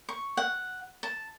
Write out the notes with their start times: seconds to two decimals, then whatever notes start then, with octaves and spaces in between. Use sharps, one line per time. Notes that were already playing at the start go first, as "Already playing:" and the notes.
0.09 C#6
0.37 F#5
1.03 A5